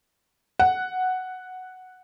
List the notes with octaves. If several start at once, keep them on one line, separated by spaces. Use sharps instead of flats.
F#5